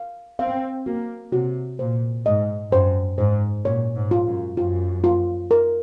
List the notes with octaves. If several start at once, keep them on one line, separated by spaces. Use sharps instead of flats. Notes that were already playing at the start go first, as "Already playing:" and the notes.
Already playing: F5
C4 F5
A#3 F#4
C3 F#4
A#2 C5
G#2 D#5
F#2 C5
G#2 C5
A#2 C#5
G#2
F4
F#2
F#2 F4
F4
A#4